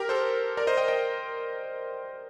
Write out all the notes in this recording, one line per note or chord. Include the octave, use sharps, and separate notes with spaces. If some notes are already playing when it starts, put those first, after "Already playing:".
Already playing: G4 A#4
A4 C5
A#4 D5
C5 D#5
D#5 G5
D#5 G5